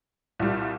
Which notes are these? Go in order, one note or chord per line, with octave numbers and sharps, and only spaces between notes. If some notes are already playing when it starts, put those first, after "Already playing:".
C2 A#2 G3